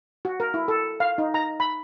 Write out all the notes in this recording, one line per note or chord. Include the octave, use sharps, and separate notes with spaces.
F#4
A#4
E4
A4
F5
D#4
A#5
B5